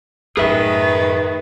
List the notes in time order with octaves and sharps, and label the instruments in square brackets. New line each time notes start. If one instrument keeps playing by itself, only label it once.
[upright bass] F#2 A2 [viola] D#3 [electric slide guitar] G#4 E5 [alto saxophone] B4